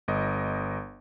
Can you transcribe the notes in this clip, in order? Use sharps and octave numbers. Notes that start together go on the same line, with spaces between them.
G1 D#5